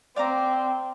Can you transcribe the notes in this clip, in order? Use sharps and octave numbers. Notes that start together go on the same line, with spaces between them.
C4 D5 F5 A#5 D6